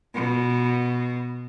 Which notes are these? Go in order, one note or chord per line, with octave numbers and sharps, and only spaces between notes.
B2